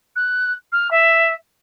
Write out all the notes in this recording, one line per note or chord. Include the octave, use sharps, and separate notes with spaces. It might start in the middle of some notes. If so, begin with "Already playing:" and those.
F#6
F6
E5